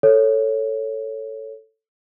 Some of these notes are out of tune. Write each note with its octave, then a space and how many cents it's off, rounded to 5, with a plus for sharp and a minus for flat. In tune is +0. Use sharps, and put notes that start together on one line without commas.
A4 +10 C#5 +0